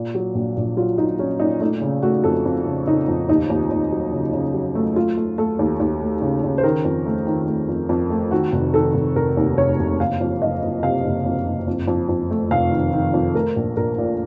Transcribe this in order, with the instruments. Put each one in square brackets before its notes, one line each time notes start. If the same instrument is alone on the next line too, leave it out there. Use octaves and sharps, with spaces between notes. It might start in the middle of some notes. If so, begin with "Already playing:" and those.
Already playing: [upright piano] A#2
F#3
A#1
A#1
F#3 F4
F#3 D#4
F#3 C#4
A#2 D#4
A3 D#4
C#3
A3 F#4
F2 A4
F2
C#3
C#3 D#4
F2
D#2 D#4
D#2
D#2
F#3
C#3
C#3
F#3
A3
A3 F4
A3
A3 A4
D#2
D#2
A3
C#3
C#3
C5
D#3 A#4
F2
A3
D#3
A3
F2
F2
A3
D#3 F#4
F1
D#3 A4
F1
F1 A#4
D#2
F1 C#5
F1
F#1 F5
F2
F#1 D#5
F#1
C3 F5
F#1
F2
F#1
F2
F2
F2
A3
F1 F5
D#3
D#3
F2
A3 A#4
A#1
A#1 A#4
A#2